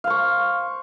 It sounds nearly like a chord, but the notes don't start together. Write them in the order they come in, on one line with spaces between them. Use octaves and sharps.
F5 C5 C#6